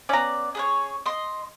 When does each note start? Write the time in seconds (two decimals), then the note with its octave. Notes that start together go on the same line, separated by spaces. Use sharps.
0.09 B3 C#4 D5 A#5
0.55 G#4 B4 C#5
1.06 D#5 C6